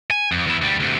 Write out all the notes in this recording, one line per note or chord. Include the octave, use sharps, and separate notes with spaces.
G#5
F2
E2 E4
D2 G3
D2 C3